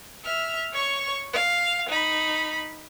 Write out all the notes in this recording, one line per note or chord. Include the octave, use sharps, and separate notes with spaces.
E5 F6
C#5 C#6
F5
D#4 B5